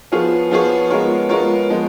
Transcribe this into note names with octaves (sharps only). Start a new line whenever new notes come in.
F3 B3 F4 G#4 C#5
F3 B3 F4 G#4 C#5
G#3 B3 F4 A#4 C#5
G#3 B3 F4 A#4 C#5
F3 G#3 B3